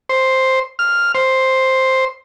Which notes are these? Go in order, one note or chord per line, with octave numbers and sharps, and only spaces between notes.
C5
F6
C5